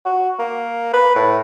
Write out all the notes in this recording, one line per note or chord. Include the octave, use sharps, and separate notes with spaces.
F#4
A#3
B4
A2